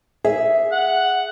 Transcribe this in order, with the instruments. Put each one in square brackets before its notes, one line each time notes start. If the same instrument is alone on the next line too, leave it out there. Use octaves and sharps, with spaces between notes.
[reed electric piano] G#4 [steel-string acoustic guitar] E5
[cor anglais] F#5